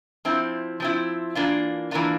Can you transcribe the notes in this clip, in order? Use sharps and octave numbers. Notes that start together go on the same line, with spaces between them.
F3 C4 E4
F3 C4 E4
E3 A#3 D4 F4
E3 A#3 D4 F4